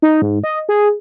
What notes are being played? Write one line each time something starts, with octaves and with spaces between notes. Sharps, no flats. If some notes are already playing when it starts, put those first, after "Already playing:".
D#4
G#2
D#5
G#4